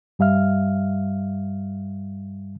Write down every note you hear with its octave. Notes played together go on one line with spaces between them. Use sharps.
G2 G3 E5 F5 F6